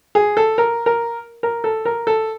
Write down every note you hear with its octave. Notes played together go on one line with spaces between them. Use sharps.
G#4
A4
A#4
A#4
A#4
A4
A#4
A4